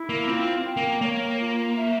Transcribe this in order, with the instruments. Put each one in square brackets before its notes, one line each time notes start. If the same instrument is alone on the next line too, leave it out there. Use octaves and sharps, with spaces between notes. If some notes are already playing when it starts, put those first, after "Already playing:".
Already playing: [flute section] E4
[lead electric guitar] A#3
[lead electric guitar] C4 [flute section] F4
[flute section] G5
[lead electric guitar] A#3
[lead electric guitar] A#3 [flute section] C#5
[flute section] F4
E5